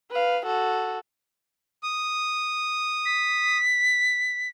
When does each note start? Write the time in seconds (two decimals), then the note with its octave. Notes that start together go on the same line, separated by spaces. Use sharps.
0.11 B4 F5
0.46 F#4 A4
1.83 D#6
3.05 B6